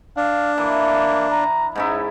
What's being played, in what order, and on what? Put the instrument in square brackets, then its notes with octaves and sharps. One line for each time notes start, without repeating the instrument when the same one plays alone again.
[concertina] D4 [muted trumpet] F5
[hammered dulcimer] E3 [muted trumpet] A#3
[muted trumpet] A#5
[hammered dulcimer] G#2 C#4 E4 [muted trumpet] D#4